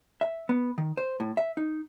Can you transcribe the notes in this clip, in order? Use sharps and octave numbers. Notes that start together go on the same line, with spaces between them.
E5
B3
D#3
C5
A2
E5
D#4